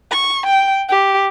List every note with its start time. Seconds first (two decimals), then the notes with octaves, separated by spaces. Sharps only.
0.11 C#6
0.46 G5
0.89 G4